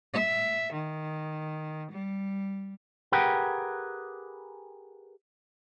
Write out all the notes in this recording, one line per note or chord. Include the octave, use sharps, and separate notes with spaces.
E5
D#3
G3
G4 G#4 A#4 B4 F#5 G5